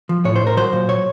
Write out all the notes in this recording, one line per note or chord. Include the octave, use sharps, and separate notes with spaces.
F3
A2 C#5
C5
A2
A#4
F#3 C5
A#2
C#5